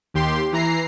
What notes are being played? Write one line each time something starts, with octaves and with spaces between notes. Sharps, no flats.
D#2 G4 C6
E3 A#5 C7